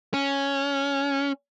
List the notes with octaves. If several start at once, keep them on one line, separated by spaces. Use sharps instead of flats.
C#4